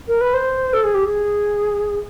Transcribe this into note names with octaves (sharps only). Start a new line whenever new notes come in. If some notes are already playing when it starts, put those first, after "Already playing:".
A#4
B4
C5
A4
G#4
G4
G#4